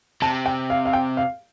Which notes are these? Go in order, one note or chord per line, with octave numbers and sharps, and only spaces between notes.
C3 A5
G5
F5
F5
G5
F5